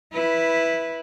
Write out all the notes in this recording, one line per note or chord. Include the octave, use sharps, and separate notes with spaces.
E4 B4